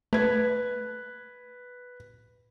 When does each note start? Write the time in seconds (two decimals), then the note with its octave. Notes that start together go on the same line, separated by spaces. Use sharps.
0.13 A3 B4 G#6